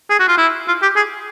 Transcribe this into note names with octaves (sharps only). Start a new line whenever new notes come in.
G#4
F#4
F4
E4
F4
G4
G#4